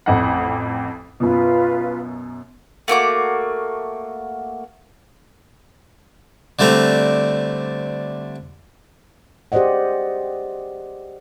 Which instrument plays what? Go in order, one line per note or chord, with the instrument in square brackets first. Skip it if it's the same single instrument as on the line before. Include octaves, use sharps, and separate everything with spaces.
[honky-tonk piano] A1 F2 F#5
[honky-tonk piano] F#2 B2 [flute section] F4 B4
[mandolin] A3 A#3 F#4 D6
[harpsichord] D3 G3 A3 C4 A#5
[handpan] G4 G#4 C5 D5 D#5 F#5